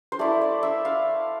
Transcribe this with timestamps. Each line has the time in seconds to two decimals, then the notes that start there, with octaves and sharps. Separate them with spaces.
0.12 C5
0.19 A3 E4 D5
0.41 D5
0.63 E5
0.85 F5